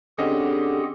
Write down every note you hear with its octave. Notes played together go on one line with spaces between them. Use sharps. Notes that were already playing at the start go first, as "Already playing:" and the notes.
D3 C4 C#4 G4 G#4 D#5 F#5